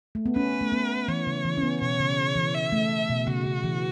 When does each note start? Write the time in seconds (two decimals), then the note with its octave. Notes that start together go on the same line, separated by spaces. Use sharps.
0.15 A3
0.26 B3
0.36 C#4 B4
0.61 A3
0.72 B3
1.08 E3 C#5
1.27 C#3
1.45 E3
1.57 C#4
1.63 B3
1.81 B2 C#5
1.99 C#3
2.36 E3
2.54 E5
2.72 A3
3.09 B2
3.27 C#3 F#4
3.45 C#3
3.64 E3